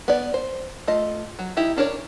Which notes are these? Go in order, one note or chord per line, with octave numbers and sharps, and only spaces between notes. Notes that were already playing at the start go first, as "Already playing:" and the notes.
B3 D5
C5
A3 F4 D#5
F#3
D#4 E4 G4
C#4 D4 A#4 C#5